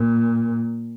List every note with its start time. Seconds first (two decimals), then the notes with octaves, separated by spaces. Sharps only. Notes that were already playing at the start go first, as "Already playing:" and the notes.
Already playing: A#2